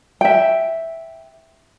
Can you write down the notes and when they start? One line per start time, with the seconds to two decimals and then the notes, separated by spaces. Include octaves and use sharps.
0.21 E5 G5